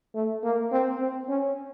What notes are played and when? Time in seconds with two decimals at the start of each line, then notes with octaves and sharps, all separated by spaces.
0.15 A3
0.43 A#3
0.71 C4
1.00 C4
1.29 C#4